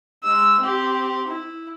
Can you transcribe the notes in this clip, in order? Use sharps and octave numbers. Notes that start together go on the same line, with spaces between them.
G#3 E6
C4 G4
E4